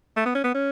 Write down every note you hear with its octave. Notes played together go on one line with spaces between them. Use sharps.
A3
B3
C#4
B3
C#4